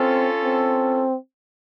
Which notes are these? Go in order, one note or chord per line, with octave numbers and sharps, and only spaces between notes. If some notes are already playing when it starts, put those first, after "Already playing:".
Already playing: C4 C#4 F4 A4
C4